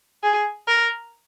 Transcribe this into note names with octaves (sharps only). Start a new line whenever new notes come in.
G#4
A#4